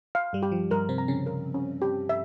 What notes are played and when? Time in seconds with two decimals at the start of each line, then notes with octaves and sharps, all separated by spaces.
0.15 F5
0.33 G2 G3
0.43 G4
0.52 F3
0.71 G2 G3 A#4
0.89 C3 C4
0.98 A#5
1.08 C#3 C#4
1.26 A#4
1.54 C#4
1.82 G4
2.09 E5